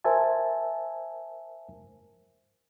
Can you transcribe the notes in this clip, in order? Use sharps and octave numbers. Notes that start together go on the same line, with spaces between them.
A#4 C5 E5 G#5 A5